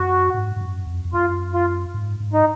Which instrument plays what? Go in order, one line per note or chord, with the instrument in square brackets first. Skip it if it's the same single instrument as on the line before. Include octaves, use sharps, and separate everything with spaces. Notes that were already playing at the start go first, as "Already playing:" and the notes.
Already playing: [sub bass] F#2 [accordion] F#4
[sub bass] G#2
G#2
F#2
F2
F2
[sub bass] F#2 [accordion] F4
[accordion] F4
[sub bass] G#2
G#2
[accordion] D#4